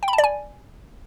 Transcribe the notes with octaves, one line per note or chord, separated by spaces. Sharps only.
G5
B5
A5
D5
G#5